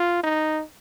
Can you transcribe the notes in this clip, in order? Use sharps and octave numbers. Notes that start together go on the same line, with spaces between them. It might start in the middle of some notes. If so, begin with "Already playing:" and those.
Already playing: F4
D#4